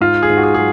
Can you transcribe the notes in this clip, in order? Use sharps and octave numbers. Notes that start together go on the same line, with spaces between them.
G#2 F4
G#4
G#2
F#4
G#4
F#3 G#4